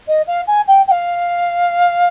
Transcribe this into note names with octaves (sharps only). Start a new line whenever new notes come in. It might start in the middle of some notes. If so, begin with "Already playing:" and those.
D#5
F5
G#5
G5
G5
F5